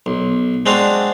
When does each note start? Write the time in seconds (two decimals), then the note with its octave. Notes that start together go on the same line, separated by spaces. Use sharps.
0.06 B1
0.66 G#3 C4 D4 F#4 F5